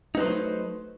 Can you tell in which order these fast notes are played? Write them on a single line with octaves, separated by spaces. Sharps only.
D#4 B4 C5 F#3 A3